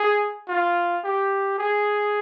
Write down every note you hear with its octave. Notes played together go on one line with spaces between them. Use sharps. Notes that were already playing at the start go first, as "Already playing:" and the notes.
Already playing: G#4
F4
G4
G#4